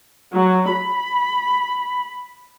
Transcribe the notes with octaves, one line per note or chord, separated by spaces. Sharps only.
F#3
B5